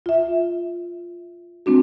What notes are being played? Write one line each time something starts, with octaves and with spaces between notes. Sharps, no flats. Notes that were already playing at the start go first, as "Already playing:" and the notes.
F4 E5
G#3 C4 D4 F#4